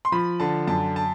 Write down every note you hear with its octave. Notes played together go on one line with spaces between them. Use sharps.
C6
F3 B5
D3 A5
F#2 A5
A5